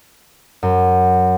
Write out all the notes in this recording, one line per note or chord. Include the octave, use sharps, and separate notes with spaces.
F#2